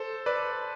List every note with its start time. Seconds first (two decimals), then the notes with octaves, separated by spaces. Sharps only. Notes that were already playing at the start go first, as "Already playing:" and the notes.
Already playing: A4 C5
0.26 B4 D5